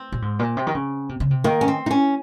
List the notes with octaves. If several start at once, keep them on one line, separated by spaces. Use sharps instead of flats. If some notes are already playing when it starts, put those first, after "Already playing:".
Already playing: C4
A#2
G#2
A#2
C3
D#3
C#3
C3
C#3
C3
D#3 A#3
C#4
C4
D#4
C#4